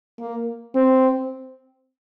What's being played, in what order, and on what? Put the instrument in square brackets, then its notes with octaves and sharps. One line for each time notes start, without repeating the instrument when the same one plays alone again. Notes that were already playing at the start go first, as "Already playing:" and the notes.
[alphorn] A#3
C4